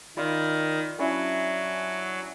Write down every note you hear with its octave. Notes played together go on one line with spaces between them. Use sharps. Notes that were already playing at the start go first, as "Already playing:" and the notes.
D#3 F4 D5 B5
F#3 C#4 D4 E4